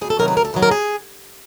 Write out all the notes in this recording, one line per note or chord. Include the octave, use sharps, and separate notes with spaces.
D2 G#4
A4
C3 D#3 F#3 A#4
B4
D2 A#4
A4
C3 D#3 F#3 B4
A#4
G#4